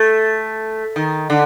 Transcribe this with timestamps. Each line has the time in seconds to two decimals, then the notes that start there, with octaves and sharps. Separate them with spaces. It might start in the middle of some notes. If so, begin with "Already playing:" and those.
Already playing: A3
0.96 D#3
1.30 D3